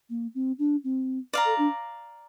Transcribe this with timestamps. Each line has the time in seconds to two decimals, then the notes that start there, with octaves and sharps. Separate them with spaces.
0.10 A#3
0.35 C4
0.59 D4
0.84 C4
1.33 D5 F5 A#5
1.45 A4
1.58 D4